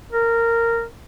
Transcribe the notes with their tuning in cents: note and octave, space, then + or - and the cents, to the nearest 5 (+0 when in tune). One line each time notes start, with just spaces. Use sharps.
A#4 -15